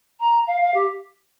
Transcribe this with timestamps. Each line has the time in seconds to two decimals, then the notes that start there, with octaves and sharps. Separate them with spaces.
0.20 A#5
0.47 F5
0.61 F5
0.74 G4